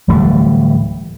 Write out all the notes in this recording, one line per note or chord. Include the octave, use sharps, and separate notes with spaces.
D1 A2 E3 G3